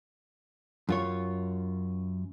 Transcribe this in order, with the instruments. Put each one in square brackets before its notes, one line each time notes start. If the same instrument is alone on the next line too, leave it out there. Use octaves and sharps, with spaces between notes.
[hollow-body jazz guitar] F#2 F4 C#5